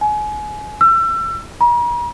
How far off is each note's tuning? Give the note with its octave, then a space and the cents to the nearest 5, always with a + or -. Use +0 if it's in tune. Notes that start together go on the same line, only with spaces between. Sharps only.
G#5 +30
E6 +35
A#5 +45